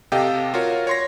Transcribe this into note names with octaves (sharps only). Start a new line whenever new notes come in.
C3 G4 A4 D#5 F5 G5
F4 F#4 A#4 C#5
C#5 C6 A#6